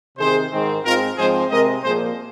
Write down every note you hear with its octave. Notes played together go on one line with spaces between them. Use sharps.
C3 D#3 C4 G#4 C5
G#2 D#3 C4
G#2 G#3 C4 F4 A#4
G#2 F3 G#3 C4 G#4 C5
C3 G#3 C4 A#4 D#5
A#2 F3 A#3 G#4 C5